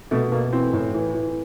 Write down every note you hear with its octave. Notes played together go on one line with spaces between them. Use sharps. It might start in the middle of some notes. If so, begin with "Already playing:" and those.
B2 A3
B2 A#3
E3 C4
A2
E3
E3